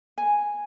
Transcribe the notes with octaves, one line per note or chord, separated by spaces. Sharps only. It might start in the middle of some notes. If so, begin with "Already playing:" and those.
G#5